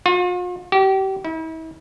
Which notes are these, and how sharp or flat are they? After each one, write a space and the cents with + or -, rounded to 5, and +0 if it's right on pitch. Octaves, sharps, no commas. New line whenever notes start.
F4 +45
G4 -30
E4 -40